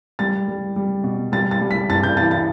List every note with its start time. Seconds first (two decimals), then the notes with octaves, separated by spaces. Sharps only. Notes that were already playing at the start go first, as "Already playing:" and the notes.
0.19 G3 A6
0.48 G3
0.76 G3
1.04 B2
1.32 G3 A6
1.51 A6
1.61 G3
1.71 B6
1.90 G2 A6
2.03 G6
2.17 E3 A6
2.31 A6